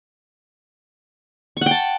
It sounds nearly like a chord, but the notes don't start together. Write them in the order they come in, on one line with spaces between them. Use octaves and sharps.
C#6 F#5 G5 A5